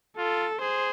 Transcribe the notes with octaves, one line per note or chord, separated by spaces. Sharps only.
F4 A4
G#4 C5